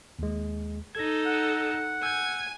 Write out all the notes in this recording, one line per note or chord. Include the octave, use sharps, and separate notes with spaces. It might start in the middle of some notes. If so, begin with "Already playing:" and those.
D#2 G#3
D#4 A4 G#6 A#6
F#5
G#5 E6 G6